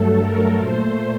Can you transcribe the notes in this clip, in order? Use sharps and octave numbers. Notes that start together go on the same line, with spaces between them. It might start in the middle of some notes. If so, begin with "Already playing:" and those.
Already playing: G2 F#3 A3 A4
A#4
A#2 A3 C5